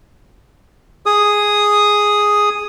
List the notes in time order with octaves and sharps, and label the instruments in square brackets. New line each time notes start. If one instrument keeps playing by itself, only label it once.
[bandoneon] G#4 D#6